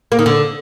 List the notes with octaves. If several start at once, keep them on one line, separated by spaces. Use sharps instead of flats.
A#3
D#3
D3